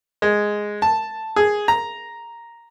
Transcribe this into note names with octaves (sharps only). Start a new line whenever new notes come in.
G#3
A5
G#4
A#5